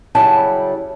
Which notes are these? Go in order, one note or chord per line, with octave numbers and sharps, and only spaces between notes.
C#3 F#3 G3 E4 G5 A5